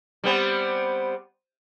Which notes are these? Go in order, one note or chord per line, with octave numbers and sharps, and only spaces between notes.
G3 B3 C4